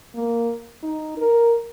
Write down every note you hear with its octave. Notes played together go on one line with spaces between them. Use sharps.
A#3
D#4
A#4